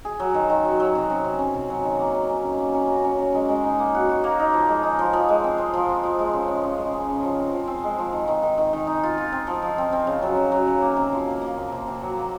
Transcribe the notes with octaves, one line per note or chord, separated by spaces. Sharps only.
G#4
F#3
D#3
D#3
F#3
F#3
C3
C#4
C3
C#4
C3
F#3
D#3
A#3
C#4
C#4
D#3
A#3
C#4
F#4
C#4
C#4
G#3
G#3
D#4
A#3
F#4
F#4
A#3
D#4
F3
G#3
D#4
F3
F3
G#3
C4
C4
F3
C4
F3
G#3
C#3
C#4
C#3
G#3
C#4
C#3
F3
C4
F3
C4
G#3
F3
D#3
D#3
D#3
D#3
D#3
D#4
F4
F4
C4
F3
F3
C4
C4
C#3
F#3
C#3
F#3
C#3
A#3
C3
F3
A#3
A#3
C3
C3
C3
F#3
A#3